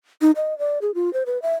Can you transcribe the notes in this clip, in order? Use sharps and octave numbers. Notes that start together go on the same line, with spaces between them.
D#4
D#5
D5
G#4
F4
C5
B4
E5